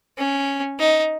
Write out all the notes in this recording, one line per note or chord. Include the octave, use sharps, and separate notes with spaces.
C#4
D#4